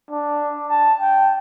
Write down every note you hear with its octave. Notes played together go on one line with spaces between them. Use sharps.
D4
A5
G5